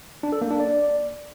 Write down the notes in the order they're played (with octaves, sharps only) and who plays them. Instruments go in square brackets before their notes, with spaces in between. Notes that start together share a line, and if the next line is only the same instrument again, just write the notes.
[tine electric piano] D4
A4
A#3
D4
D5